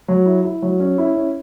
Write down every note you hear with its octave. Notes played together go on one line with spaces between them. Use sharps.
F#3
E4
E4
F#3
C#4
E4
C#4